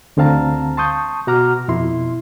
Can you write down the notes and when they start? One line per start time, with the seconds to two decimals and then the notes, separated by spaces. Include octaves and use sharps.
0.17 D2 D3 C4 F5 A5 A#5
0.77 A5 C6 C#6 D#6 G6
1.27 B2 F#4 F#5 A#5 D6 F6
1.68 F2 B2 E4 C6